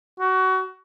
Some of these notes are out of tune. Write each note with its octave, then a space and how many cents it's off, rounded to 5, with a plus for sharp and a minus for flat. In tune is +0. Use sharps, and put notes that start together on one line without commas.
F#4 +20